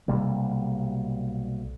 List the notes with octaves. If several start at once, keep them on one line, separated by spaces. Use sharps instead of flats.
B1 C3 G3 A#3